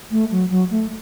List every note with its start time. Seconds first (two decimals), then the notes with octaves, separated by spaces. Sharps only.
0.11 A3
0.31 F#3
0.50 F#3
0.71 A3